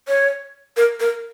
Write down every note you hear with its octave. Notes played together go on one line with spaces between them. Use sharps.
C#5
A#4
A#4